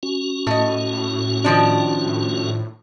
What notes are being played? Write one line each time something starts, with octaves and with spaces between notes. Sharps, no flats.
C#4 F#4
A2 A3 D#5
D#3 F3 D4